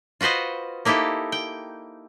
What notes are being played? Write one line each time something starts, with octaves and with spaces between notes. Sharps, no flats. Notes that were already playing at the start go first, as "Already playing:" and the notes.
F4 F#4 B4 C5 D#5
A#3 D#4 E4 G4 A4
G5